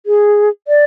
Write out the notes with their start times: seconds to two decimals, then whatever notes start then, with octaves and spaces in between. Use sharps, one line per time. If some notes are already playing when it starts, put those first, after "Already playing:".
0.06 G#4
0.68 D5